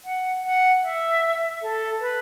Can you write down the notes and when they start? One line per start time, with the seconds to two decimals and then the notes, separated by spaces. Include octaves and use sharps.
0.05 F#5
0.45 F#5
0.83 E5
1.62 A4
2.00 B4